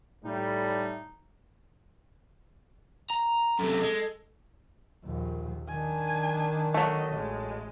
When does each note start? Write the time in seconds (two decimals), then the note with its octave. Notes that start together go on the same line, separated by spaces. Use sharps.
0.24 A2 G3 D#4
3.10 A#5
3.59 F#2 C3 A4
3.81 G#3
5.05 A#1 D#2
5.69 D#3 D4 G#5
6.74 F#3 A3 D#5
7.15 A1 G#3